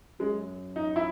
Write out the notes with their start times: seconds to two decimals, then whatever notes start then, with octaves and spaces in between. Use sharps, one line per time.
0.20 F#2 G#3
0.76 D#4
0.96 E4